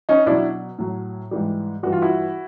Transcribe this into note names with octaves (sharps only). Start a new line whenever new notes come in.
C#4 D#4
B2 F#3 D4 E4
A2 F#3
G#2 E3 G3
G2 E3 G3 F#4
F4
E4 F#4